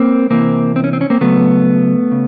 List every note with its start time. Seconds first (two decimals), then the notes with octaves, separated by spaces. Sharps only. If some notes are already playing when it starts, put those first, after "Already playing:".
Already playing: A#3 C4
0.30 C3 E3 A#3 C4
0.76 C4
0.84 C#4
0.93 C4
1.01 C#4
1.10 A#3 C4
1.21 C#3 F#3 A3 B3
2.12 C#3